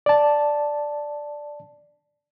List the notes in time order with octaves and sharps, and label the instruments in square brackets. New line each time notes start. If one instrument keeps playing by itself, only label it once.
[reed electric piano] D5 A5